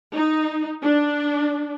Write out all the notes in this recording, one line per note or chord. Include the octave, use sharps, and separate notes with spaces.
D#4
D4